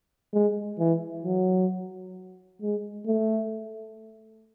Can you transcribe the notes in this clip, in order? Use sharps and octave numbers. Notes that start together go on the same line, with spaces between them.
G#3
E3
F#3
G#3
A3